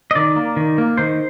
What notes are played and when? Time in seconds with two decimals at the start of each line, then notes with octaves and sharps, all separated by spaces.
0.11 D#5
0.15 D#3 D5
0.36 A#3
0.57 D#3
0.78 A#3
0.98 D#3 C5